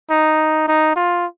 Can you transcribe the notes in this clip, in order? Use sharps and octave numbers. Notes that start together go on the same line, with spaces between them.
D#4
D#4
F4